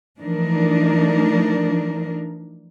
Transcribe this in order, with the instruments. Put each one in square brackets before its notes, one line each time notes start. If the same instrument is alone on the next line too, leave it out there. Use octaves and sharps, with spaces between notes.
[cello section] E3 F3 A3 D4 D#4 A#4